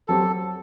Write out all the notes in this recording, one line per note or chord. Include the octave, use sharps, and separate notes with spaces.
F#3 C4 G4 A4